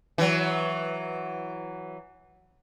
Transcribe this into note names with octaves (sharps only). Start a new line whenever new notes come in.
E3 F#3